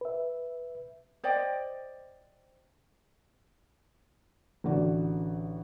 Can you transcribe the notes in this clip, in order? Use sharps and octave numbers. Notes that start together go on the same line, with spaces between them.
B4 E5
C5 D5 D#5 G5
A1 D3 F#4 D5